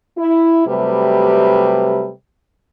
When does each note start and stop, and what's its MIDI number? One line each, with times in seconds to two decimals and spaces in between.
0.17 0.64 64
0.66 2.10 48
0.66 2.10 54
0.66 2.10 55
0.66 2.10 57
0.66 2.10 71